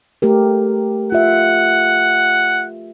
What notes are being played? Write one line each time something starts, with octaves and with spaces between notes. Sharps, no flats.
A3 G4 A#4
F4 E5 F#5